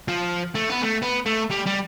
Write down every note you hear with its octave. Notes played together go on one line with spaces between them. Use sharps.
F3
A3
B3
A3
B3
A3
G3
G3